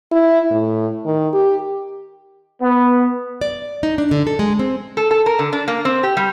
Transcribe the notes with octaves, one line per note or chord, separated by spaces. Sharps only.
E4
A2
D#3
G4
B3
D5
D#4
D4
D3
A4
G#3
C4
A4
A4
A#4
D3
D4
A#3
C4
G4
G3